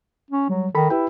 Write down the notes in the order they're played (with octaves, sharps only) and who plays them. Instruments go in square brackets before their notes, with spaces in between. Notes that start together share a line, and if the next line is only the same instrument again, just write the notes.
[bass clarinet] C#4
[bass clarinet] F#3 [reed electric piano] G3
[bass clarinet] D#3 [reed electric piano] A4 B5
[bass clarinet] E4 [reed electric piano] G4 B4 G5